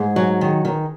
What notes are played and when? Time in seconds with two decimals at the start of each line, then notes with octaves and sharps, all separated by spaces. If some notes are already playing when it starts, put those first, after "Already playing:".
Already playing: G#2 G#4
0.16 F#3
0.41 D#3
0.65 D#3